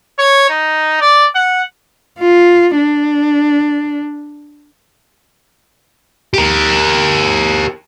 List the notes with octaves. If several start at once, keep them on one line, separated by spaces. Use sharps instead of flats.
C#5
D#4
D5
F#5
F4
D4
G4 A#4